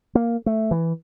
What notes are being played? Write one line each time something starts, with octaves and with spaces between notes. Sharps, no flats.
A#3
A3
E3